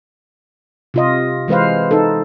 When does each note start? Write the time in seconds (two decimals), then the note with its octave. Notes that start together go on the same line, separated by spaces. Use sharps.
0.94 C3 F4 D#5
1.48 E3 G#3 B4 C5 F5
1.91 D#4 A4